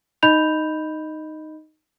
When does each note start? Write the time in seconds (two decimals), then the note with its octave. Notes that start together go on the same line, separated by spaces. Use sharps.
0.23 D#4 D#5 B5 G6 F7